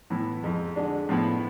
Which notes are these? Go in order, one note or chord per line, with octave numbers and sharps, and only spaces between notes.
A2 E3 B3 E4
F2 C3 G#3
D3 G#3 D4
A2 F3 B3 E4